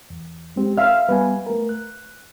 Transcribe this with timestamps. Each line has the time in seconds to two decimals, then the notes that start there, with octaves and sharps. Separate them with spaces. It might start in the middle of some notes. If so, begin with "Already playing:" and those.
0.10 E2
0.56 G#3 C4 G4
0.77 E5 F5 F6
1.09 G3 B3 B4 G#5
1.46 A3 A#4
1.69 F#6